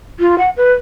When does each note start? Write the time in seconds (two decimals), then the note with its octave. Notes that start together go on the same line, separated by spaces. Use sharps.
0.20 F4
0.38 F#5
0.57 B4